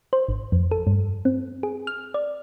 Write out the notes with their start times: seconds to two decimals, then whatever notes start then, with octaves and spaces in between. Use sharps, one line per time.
0.13 C5
0.29 G#1
0.52 F2
0.71 A4
0.87 G2
1.25 C4
1.63 G#4
1.87 F6
2.14 D5